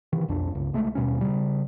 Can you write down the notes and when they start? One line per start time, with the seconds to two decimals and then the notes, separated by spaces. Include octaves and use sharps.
0.13 C3 D#3 E3
0.28 B1 F2 D4
0.50 G1 C#2
0.73 C2 G#3 A3
0.95 D#2 B2 G3 C#4
1.21 C#3 G3